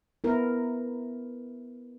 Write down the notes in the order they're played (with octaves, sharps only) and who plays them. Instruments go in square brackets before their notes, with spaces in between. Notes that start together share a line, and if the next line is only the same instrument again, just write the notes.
[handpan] B3 E4 A#4